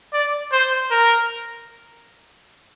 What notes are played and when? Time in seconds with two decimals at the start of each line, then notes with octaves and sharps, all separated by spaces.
0.13 D5
0.52 C5
0.91 A#4